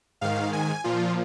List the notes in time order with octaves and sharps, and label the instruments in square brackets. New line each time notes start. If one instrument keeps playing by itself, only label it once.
[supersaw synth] G#2 D#3 F5
G#5
A#2 F3 F4